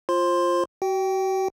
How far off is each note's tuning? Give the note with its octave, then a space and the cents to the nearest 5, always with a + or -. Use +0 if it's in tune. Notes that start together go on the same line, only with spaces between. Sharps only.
F4 +0 C5 +25 C6 +0
F#4 +35 G5 -10